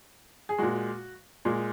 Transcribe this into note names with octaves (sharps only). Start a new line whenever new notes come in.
G#4
A#2 G#3 F#4
A#2 G#3